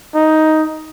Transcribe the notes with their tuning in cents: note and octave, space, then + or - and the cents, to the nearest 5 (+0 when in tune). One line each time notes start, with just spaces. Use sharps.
D#4 +10